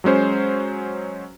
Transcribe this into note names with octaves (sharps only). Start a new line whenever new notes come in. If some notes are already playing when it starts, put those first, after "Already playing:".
F#3 G#3 C#4 C5